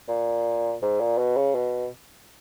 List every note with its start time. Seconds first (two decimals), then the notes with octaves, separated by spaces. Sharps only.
0.08 A#2
0.82 G#2
1.00 A#2
1.18 B2
1.37 C#3
1.54 B2